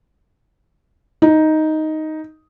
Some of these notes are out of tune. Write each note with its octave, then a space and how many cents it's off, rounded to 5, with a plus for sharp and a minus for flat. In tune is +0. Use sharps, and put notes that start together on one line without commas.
D#4 +5